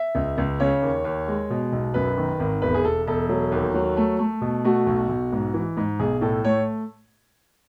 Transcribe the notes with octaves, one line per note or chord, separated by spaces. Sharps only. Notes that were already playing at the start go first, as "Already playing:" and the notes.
Already playing: E5
C#2
C#2
C#3 C#5
D#2
D#2
G#3
B2
B1
F#2 B4
D#3
G#1
E1 B4
G#4
E1 A4
E1 A4
F#3
D#2
F#3
A3
A3
B2
A3 F#4
B1
B1
G#2
E3
G#2
B1 G#4
A2 A4
A3 C#5